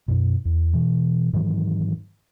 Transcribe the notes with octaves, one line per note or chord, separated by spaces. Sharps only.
F#2 B2
E2
B2 E3
G#2 D#3 E3 F#3